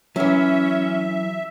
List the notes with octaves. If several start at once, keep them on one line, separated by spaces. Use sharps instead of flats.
E3 F#3 C#4 E5